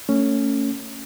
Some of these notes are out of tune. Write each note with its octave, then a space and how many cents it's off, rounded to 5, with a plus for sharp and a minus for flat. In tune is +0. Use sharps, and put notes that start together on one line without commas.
A3 +35 C#4 +0